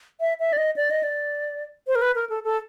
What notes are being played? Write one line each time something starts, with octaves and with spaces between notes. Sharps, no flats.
E5
E5
D5
D#5
D5
D#5
D5
C5
A#4
B4
A#4
A4
A4